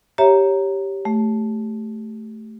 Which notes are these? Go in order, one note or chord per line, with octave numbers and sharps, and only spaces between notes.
G4 C#5 E5 A#5
A3